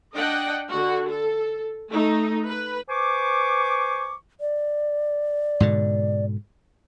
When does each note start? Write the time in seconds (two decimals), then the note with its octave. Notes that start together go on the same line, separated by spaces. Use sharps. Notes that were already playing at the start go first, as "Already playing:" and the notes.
0.15 D4 D#5 F#5 G5
0.70 D3 F#4
1.10 A4
1.88 A3 D#4
2.47 B4
2.89 B4 C5 G#5 C#6 D6
4.40 D5
5.60 G#2 B2 D3